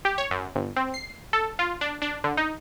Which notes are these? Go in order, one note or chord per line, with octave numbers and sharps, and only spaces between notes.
G4
C#5
F#2
G1
C4
C7
A4
F4
D4
D4
D3
D#4